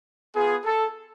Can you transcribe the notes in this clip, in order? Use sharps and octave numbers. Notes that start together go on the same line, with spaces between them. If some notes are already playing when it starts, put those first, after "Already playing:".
B3 F4 G#4
A4